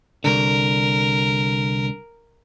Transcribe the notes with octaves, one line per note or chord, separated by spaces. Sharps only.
C2 D3 A#4